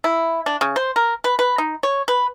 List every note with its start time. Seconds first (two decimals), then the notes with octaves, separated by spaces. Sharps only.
0.04 E4
0.46 D4
0.61 C#3
0.76 C5
0.96 A#4
1.24 B4
1.39 B4
1.58 D#4
1.83 C#5
2.08 B4